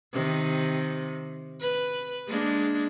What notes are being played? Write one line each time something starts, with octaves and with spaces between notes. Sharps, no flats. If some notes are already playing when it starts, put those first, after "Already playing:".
C3 D#3
B4
G#3 A#3 D4